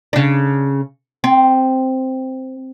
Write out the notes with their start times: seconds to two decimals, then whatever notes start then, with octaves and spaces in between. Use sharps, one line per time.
0.13 C#3 D4
1.24 C4